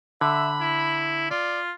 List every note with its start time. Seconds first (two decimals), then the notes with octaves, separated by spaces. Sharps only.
0.21 D3 E5 B5
0.61 E4
1.31 F4 D5